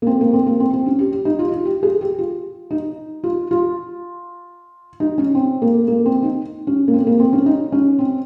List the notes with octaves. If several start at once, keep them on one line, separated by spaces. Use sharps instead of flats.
A#3
C4
A#3
C4
A#3
C4
C4
C#4
G4
G4
D#4
F4
F4
G4
G#4
G4
F4
D#4
F4
F4
D#4
C#4
C4
A#3
A#3
C4
D#4
C#4
A#3
C4
A#3
C4
C#4
D#4
C#4
C4